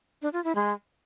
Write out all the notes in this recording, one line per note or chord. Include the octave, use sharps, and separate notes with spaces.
D4
F4
E4
G#3